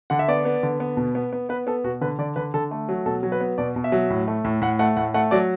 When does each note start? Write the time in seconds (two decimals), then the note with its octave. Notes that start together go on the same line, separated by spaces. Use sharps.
0.10 D3 F#5
0.19 E5
0.28 B3 D5
0.45 B3
0.63 D3
0.80 B3
0.97 B2
1.15 B3
1.33 B3
1.49 B3 B4
1.67 B3 A4
1.84 B2 F#4
2.01 D3 B4
2.19 D3 D5
2.36 D3 B4
2.54 D3 A4
2.71 A3
2.89 F#3
3.06 B2 A4
3.23 F#3
3.32 B4
3.41 B3
3.58 B2 D5
3.76 B2
3.84 E5
3.92 F#3
4.10 A2
4.28 A3
4.45 A2
4.62 A2 F#5
4.79 A3 F#5
4.97 A2 F#5
5.14 A3 F#5
5.31 F#3 D5